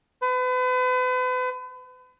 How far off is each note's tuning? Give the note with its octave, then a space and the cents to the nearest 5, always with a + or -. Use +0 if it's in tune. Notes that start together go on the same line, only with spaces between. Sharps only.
B4 +40